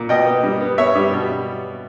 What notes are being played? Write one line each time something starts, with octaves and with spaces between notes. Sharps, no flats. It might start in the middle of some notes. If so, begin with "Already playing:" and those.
Already playing: A#2
B2 D#5 G5
B3
G3
B3
B3 C#5 E5
G3
B2